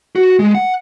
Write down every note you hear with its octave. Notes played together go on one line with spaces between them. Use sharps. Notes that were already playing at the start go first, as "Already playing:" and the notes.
F#4
G#3
F#5